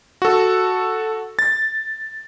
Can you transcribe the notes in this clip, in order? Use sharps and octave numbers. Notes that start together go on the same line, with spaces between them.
F#4 A4
A6